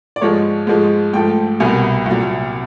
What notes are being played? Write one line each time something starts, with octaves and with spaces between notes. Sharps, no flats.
D5
G#2 F3 G#3 C#5
G#2 F3 G#3
G#2 F3 A3 G5
C2 B2 G3 A#3 G#5
C2 A#2 F#3